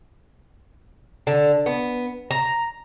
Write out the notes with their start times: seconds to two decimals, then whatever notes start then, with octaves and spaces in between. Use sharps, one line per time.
1.27 D3
1.66 B3
2.31 A#5